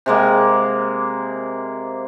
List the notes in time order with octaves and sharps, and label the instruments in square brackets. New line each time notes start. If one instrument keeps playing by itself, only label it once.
[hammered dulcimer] C3 G#3 A#3